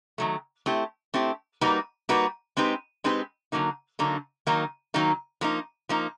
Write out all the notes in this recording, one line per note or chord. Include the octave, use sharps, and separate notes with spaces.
D#3 F#3 A3
A3 C4 E4 G4
A3 C4 E4 G4
G3 A#3 D#4 F#4 B4
G3 A#3 D#4 F#4 B4
G#3 C4 D#4 G4 B4
G#3 C4 D#4 G4 B4
D3 F#3 A#3 D#4
D3 F#3 A#3 D#4
D#3 F#3 A#3 D#4
D#3 F#3 A#3 D#4
F3 A#3 D#4
F3 A#3 D#4